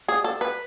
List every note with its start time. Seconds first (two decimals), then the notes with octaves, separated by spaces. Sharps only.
0.08 G#4
0.24 A4
0.41 B4